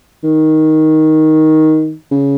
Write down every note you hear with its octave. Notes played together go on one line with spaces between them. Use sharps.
D#3
C#3